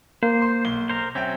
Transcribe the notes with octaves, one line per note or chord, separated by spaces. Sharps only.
A#3 C5
C6
B1 G7
A#4 C5
F#3 C4 C#4 E5 G5